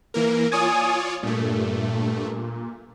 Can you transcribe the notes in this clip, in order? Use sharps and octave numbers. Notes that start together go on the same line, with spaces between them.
E3 A#3 A#4
F4 C#5 D5 G#5 D#6
G2 A#2 A3